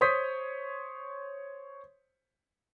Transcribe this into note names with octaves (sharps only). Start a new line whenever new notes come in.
C5 C#5 C6 D#6 G6 B6